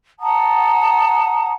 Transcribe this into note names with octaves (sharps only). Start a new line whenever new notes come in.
F#5 A5 A#5 D#6